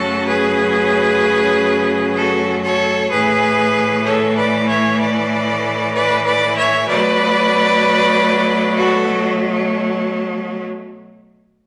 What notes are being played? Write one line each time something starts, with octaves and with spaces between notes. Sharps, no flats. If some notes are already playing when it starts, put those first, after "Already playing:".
Already playing: F#2 C#3 F#3 A3 F#4 A4
G#4 B4
F#4 A4
A4 C#5
A2 E3 A3 G#4 B4
A4 C#5
B4 D5
C#5 E5
B4 D5
B4 D5
B4 D5
C#5 E5
B2 F#3 A3 B4 D5
F#4 A4